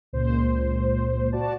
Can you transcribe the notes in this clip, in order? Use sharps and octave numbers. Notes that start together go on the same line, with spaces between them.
C#2 A#2 C5
F#4 D5 A5